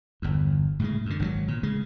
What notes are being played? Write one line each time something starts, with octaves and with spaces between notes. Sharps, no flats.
G1 E2
A2 C#3 G#3
F#2 D3
G#1 D3 F#3
A#2
C#3 G#3